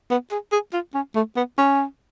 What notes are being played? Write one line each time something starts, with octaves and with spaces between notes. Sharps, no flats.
B3
G#4
G#4
F4
C#4
A3
B3
C#4